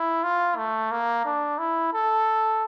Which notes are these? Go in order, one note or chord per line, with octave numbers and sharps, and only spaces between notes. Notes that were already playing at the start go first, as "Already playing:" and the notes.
Already playing: E4
F4
A3
A#3
D4
E4
A4